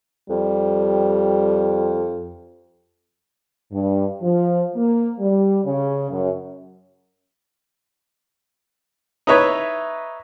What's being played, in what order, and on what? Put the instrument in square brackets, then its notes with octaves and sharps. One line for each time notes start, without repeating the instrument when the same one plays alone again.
[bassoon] F2 [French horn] G3
[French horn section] G2
F3
A#3
G3
C#3
F#2
[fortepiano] D#4 E4 B4 C#5 E5